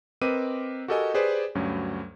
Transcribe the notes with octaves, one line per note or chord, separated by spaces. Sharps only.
C4 A#4 B4 D#5 D6 D#7
F#4 G4 A4 A#4 D#5 G#5
G4 G#4 B4 C5 D5
D2 G2 F#3 C#4